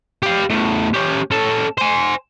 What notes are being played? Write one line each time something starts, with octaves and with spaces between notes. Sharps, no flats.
G4 F5
E2 A3
C#4 G4
C#4 A4
C5 G#5